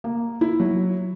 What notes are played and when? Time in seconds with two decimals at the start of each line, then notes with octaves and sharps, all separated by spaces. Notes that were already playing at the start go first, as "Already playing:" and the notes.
0.04 A#3
0.41 E4
0.60 F#3